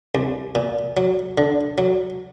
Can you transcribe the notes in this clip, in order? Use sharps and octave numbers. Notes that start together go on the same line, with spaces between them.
C2
A#2
F#3
D3
F#3